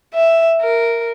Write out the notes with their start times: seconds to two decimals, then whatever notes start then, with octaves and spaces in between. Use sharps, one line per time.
0.14 E5
0.61 A#4